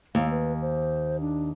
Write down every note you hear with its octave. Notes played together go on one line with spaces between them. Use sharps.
D#2 F5
B4
C5
D4